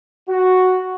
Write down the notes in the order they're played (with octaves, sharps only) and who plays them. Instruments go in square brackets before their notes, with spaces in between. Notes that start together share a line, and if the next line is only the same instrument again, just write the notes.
[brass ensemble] F#4